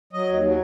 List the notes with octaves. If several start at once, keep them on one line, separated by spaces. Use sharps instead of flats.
F#3 D#5
D#2
F#3